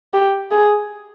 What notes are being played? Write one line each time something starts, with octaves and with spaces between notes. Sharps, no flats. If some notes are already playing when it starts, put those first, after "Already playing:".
G4
G#4